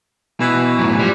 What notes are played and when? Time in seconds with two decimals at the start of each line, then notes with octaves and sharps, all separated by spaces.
0.40 B2 E3
0.79 F#2 A2
0.99 F3 G3